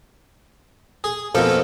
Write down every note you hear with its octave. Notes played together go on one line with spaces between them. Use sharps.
G#4
F2 B2 F3 A#3 A4